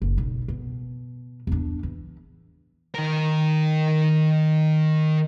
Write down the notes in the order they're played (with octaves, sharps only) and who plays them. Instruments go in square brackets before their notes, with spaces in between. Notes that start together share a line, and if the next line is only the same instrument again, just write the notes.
[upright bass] F#1
B1
B2
E2 D4
E3
[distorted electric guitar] D#3 A#4